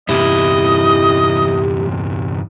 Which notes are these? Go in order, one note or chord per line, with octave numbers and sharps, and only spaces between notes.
E2 G2 C3 E4 G4 D#5